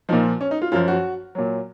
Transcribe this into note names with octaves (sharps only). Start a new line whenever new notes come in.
A#2 F3 D#4
C#4
D#4
F4
F#2 F3 F4
F#4
A#2 F#3